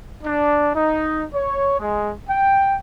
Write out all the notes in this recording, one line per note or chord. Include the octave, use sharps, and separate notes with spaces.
D4
D#4
C#5
G#3
G5